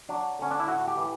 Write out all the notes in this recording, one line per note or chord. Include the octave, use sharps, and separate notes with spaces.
F#3 D4
D3 C#4
D4
E4
A2 F#4
G4
E3